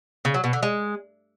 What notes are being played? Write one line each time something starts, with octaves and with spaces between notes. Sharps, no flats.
C#3
F#3
B2
D3
G#3